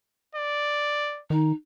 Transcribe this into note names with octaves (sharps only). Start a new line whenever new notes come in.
D5
D#3 D#4